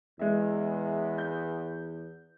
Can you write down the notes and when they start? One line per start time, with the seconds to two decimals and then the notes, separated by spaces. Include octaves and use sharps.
0.19 E2 G#3 E5
1.18 G6